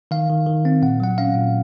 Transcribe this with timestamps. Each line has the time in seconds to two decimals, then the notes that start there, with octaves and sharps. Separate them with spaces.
0.11 D#3 F5
0.29 D#3
0.47 D#3
0.65 C4
0.82 A#2 F#5
1.00 F#3 F#5
1.18 C#4 F5
1.36 A#2